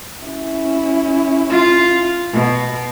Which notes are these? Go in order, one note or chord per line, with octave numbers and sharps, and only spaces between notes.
C#4 E4
F4
B2